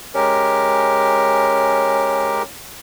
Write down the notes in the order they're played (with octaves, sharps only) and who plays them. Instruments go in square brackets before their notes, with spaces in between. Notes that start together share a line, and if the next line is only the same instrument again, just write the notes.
[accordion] G#3 G4 A#4 [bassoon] C#4